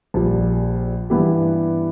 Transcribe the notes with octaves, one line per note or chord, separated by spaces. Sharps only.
A#1 A#2 G3
G2 E3 B3 E4 G4